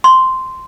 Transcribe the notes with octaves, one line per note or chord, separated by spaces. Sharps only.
C6